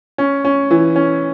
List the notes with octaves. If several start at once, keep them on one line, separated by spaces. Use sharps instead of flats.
C#4
C#4
E3
C#4